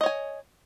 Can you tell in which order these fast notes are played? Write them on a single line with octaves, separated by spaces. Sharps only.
D#5 C#5 G#5